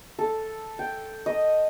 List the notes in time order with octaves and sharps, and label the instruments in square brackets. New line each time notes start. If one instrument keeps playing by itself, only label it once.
[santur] A4
G5
D#5